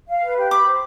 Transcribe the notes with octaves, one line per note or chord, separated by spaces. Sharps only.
F5
B4
G4
B5 D6
C5